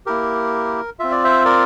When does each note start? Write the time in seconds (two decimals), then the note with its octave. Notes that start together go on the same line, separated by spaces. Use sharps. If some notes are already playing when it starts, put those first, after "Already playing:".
0.06 A#3 E4 G4 A#4
0.99 C4 F4 E5
1.11 D5
1.24 C5 E5
1.45 A#4 D5